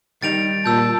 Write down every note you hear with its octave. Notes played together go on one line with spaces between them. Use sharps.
D#3 G3 D#4 A6 D7 F7
A#2 A5 E6 G6